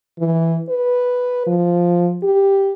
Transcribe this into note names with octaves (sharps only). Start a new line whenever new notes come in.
E3
B4
F3
G4